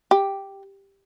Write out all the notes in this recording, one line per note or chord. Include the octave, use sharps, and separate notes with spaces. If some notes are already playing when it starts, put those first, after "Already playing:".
G4